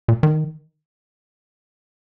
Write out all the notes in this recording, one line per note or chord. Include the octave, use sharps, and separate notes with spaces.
A#2
D#3